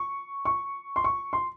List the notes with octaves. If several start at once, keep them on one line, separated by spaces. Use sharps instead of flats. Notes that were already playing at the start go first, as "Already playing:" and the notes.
Already playing: C#6
C#6
C6
C#6
C6